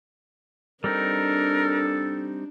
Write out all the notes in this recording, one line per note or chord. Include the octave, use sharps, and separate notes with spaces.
G3 C4 D4 D#4 A4 A#4